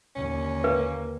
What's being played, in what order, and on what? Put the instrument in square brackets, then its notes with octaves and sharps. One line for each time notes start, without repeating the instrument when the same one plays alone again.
[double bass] D#2 D3 [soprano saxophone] C#4
[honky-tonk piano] A#3 [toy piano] B4